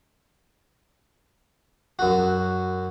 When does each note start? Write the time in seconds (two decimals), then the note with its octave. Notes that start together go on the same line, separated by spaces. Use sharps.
1.99 F#2 F#4